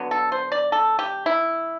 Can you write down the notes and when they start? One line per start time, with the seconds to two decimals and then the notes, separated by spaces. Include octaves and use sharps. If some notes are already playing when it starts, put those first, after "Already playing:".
Already playing: D3 F#3 B3
0.11 A4
0.32 C5
0.52 D5
0.72 A4
0.99 G4
1.26 E4